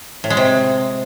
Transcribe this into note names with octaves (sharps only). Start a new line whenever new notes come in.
A2
G#3
C3